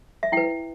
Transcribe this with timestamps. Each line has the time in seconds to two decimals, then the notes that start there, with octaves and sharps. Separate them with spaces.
0.23 E5
0.32 E4 B4 G5